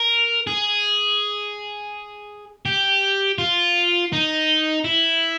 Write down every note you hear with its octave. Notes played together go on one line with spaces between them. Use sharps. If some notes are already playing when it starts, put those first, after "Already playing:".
Already playing: A#4
G#4
G4
F4
D#4
E4